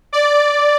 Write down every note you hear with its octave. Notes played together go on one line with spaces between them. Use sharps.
D5